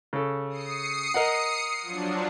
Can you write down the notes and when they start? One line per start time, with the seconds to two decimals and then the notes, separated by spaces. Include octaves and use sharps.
0.13 C#3 A4
0.49 D#6 C7 C#7
1.14 A#4 D#5 F#5
1.82 F3 F#3 D4